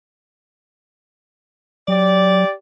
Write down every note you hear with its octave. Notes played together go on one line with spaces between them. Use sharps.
F#3 G4 D5